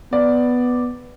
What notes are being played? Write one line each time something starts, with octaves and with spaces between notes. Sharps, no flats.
B3 D5